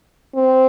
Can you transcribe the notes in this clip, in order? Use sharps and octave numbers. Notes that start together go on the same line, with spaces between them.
C4